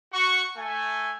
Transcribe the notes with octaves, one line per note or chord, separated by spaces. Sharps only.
F#4 C#6
A3 G#5